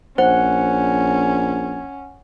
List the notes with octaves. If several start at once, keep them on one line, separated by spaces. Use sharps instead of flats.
A#1 C#4 C5 F#5